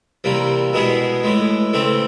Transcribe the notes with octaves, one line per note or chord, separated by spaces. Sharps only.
C3 E3 G3 A#3
B2 G#3 B3 E4 G#4
A2 E3 G#3
C#3 E3 A3 C4